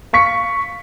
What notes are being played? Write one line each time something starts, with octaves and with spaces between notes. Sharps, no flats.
F5 C#6 B6 C#7